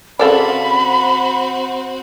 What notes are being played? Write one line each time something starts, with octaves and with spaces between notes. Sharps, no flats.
C#3 C4 F#4 A4 D5 B5